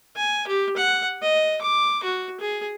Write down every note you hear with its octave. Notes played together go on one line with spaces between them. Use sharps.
G#5
G4
F#5
D#5
D6
F#4
G#4